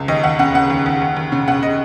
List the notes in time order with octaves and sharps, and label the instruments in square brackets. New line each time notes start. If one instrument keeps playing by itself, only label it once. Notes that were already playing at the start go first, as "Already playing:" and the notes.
Already playing: [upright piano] C#2
D#2 D#5
D#2 F#5
C#3 F#5
C#3 F#5
D#2
D#2
D#2
D#2
C#3
C#3 F#5
D#5